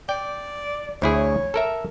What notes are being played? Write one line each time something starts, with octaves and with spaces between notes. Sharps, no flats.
D5 G5
D2 E4 G#4 C#5
A4 A#4 E5